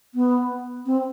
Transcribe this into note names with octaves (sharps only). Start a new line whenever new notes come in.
B3
C4